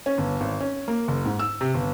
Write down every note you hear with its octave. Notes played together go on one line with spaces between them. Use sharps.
C#4
G1
G#1
C#4
A#3
F#1
G#2
E6
C3
G1